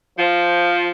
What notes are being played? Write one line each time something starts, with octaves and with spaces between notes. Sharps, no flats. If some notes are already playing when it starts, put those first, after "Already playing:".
F3